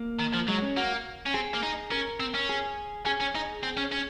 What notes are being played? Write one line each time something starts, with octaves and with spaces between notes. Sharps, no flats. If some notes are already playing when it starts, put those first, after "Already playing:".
Already playing: A#3
D#3
F3
F#3 G#3
C#4
A#3 F#4
C#4
C4 G#4
A#3
D#4
C#4 A#4
C4
C#4
G#4
C#4 G#4
C#4
D#4
C4
C#4
C#4